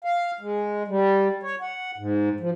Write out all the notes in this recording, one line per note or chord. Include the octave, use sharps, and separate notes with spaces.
F5
G#3
G3
C#5
F#5
G#2
F3